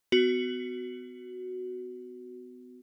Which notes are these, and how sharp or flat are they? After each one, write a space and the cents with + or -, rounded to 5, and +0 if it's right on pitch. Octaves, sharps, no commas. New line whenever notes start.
B3 +30 F#4 +0